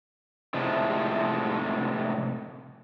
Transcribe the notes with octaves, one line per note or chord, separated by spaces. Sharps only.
A2 C3 F3 G#3 A3